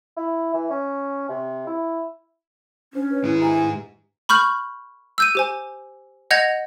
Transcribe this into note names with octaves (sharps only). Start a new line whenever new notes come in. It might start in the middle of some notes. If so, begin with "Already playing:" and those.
E4
E3
C#4
C3
E4
C#4 D4 C5
B4 C#5
G#2 D#3 E4 G#4
G4 E5 G#5 A#5
B5 C#6 F6 G6 F#7
E6 G6 D#7
G4 C5 G#5
D#5 F#5 G6 G#6 A#6 F7